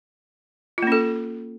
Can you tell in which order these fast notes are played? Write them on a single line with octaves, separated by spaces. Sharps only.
F4 A#3 C#4 A4